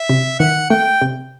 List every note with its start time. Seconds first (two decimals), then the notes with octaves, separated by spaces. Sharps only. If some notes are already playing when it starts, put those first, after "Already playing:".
Already playing: E5
0.10 C3
0.39 D#3 F#5
0.70 A3 G5
1.02 C3